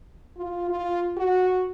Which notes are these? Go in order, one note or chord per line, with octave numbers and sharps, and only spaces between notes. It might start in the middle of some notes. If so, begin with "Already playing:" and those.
F4
F4
F#4